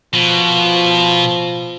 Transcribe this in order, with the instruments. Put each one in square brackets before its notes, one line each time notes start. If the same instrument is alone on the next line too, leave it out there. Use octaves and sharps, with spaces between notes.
[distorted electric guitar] B2 [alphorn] F3